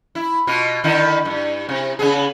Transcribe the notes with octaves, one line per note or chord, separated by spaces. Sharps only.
E4
B2 F4
D3 D#3 E4
G2
C3
C#3 B3 G#4